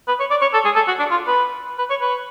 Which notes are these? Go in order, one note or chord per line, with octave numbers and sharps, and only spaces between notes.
B4
C#5
D5
C#5
A4
G#4
A4
F#4
D4
F4
B4
B4
C#5
B4